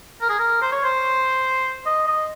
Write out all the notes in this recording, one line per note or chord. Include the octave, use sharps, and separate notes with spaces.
A#4
G#4
A#4
C5
C#5
C5
D#5
D#5